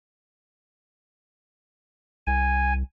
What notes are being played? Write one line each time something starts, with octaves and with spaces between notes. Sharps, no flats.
C2 G#5